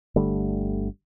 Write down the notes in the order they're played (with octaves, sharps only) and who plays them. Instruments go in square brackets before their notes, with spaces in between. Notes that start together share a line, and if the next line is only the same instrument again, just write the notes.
[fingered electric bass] G1 D3 G3 A3